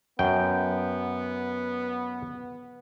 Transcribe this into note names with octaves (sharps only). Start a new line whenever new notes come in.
F#2 B3 G5